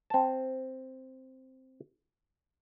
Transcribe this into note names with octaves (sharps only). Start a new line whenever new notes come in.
C4 A5